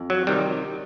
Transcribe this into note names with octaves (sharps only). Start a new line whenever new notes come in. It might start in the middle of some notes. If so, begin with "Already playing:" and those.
Already playing: F2
F#3
C3 D#3 G3